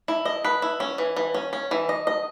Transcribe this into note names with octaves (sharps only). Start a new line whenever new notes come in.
E4
D#5
B4
E4
C#4
E3
E3
C#4
C#4
E3
D#5
D#5